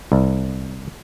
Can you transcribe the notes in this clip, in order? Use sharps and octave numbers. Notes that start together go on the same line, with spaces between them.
C2